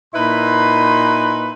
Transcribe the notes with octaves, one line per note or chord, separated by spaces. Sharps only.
A#2 D#4 E4 B4 B5 C6